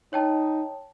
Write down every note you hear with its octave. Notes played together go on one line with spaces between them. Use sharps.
D#4 C#5 G5 A5